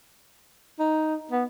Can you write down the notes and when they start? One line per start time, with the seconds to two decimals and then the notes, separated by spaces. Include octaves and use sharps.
0.79 D#4
1.32 B3